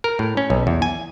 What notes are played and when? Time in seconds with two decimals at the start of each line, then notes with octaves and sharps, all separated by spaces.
0.04 A#4
0.19 A2
0.37 C#4
0.50 B1
0.67 E2
0.82 G#5